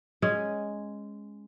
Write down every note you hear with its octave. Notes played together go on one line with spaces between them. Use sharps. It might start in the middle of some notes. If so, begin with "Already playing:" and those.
G#3 C#4 G#4